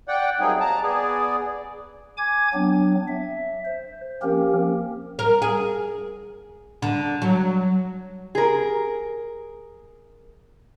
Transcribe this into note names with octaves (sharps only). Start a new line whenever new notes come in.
D5 F#5 G5
F#3 G3 A#3 C4 D#4 G#4
A5 A#5
B3 G#4 D5
G#5 D6 G#6
F#3 B3 C4 D4
E5
C5
F3 A#3 C4 C#4 G4 A#4
A#4
G#4
D3
F#3
G#4 A#4